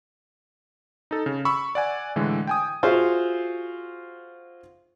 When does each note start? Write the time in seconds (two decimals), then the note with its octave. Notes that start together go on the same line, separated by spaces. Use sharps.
1.11 D#4 A4
1.26 C#3
1.45 B5 C#6 E6
1.75 D5 F#5 G#5
2.16 A2 D3 E3 G#3
2.47 G5 G#5 D#6
2.83 F4 F#4 G#4 C5 E5 F5